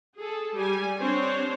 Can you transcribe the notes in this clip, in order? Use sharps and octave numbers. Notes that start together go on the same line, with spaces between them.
G#4 A4
G3 G#5
C4 D4 C5 C#5